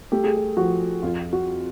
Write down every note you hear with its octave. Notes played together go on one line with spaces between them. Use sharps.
A3 G4
G#4
G4
F3 F#4
F2 F4
F#4